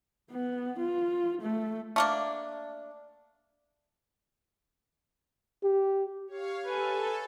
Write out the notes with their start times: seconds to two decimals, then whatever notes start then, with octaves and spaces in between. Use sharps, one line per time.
0.31 B3
0.79 F4
1.42 A3
1.96 A3 A#3 D4
5.63 G4
6.28 G4 C#5 F5
6.65 A4 B4 G#5